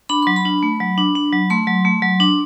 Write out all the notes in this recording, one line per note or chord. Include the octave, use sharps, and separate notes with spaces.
D4 B5
F#3 C6
B5
D4
A3
F#3
D4
D4
F#3
A3 C6
F#3
A3
F#3
D4